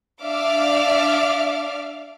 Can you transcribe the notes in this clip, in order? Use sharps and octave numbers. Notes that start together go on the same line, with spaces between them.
D4 D5 E5 F5 D6 F6